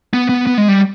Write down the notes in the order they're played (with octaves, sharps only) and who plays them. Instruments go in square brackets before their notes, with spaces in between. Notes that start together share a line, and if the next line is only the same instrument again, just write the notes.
[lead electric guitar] B3
B3
B3
G#3
G3